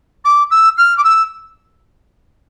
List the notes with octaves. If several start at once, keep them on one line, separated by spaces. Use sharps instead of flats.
D6
E6
F6
D6
E6